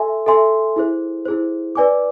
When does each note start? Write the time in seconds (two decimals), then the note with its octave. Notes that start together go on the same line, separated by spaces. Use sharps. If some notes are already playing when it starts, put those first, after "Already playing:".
Already playing: A4 E5 G#5 C6
0.26 A4 E5 G#5 C6
0.76 E4 G#4 C5
1.25 E4 G#4 C5
1.75 B4 D5 G#5 D6